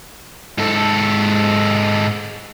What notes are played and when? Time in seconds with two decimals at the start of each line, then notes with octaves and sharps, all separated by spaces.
0.58 G#2 A4